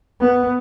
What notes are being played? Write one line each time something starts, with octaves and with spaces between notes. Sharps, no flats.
B3